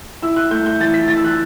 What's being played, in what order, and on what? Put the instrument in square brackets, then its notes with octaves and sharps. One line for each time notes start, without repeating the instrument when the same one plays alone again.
[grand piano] E4 E6
F#6
A3 G6
G6
E3 A6
B6
E3 A6
E6
F#6